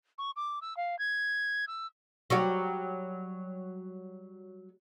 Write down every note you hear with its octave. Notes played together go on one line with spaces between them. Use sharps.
C#6
D6
E6
F5
G#6
E6
F#3 G3 F#4